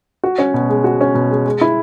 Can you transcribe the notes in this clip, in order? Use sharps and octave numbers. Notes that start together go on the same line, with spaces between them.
F#4
C#4
B2
G#3
F#4
C#4
B2
G#3
G#3
E4